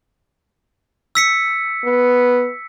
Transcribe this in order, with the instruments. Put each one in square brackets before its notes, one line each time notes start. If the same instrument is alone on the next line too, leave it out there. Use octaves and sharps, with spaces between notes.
[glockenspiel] E6 B6 C#7
[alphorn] B3